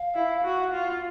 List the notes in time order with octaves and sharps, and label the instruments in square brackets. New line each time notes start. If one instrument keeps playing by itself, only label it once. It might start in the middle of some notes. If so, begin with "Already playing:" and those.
Already playing: [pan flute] F5
[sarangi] E4
F#4
F4